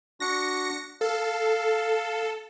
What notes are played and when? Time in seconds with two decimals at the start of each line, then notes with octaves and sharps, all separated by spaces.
0.20 D4 F#4 A#6 C#7
1.01 A4 F5